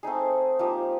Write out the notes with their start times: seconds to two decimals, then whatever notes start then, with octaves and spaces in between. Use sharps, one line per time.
0.03 A3 C4 D#4 G#4
0.59 F3 A#3 D#4 G4